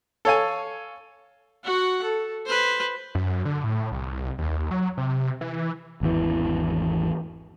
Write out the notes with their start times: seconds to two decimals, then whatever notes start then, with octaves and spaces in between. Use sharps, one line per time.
0.25 A4 C#5 F5 G#5
1.64 F#4 F#5
2.03 A4
2.46 B4 C5
3.15 F#2
3.45 D3
3.64 A2
3.92 C2
4.39 D#2
4.71 F#3
4.98 C3
5.41 E3
6.01 G#1 E2 E3